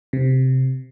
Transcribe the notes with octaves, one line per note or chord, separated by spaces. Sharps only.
C3